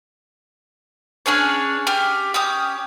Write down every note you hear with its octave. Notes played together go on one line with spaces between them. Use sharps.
C#4 D4 G#4 C#5
G4 F6
C#4 G4 D#6